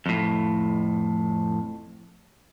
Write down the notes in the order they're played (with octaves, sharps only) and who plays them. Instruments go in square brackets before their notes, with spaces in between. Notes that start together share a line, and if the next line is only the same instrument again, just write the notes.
[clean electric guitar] F2 A2